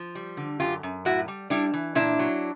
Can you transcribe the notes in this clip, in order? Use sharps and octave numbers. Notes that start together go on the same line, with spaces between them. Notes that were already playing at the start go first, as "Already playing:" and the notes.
Already playing: F3
G3
D3
F#2 F4 G4
F#2
A2 E4 F#4
G3
G3 D4 E4
E3
A#2 D4 E4
F#3